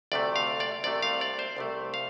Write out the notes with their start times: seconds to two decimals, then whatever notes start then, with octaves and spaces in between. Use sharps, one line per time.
0.12 D2 C3 A3 D5
0.36 F5
0.60 D5
0.84 C2 C3 A3 D5
1.02 F5
1.21 D5
1.39 C5
1.57 C2 C3 A3
1.94 F5